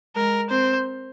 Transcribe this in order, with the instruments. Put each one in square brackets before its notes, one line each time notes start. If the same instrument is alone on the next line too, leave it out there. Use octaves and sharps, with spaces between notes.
[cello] G#3 [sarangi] A#4
[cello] C4 [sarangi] C5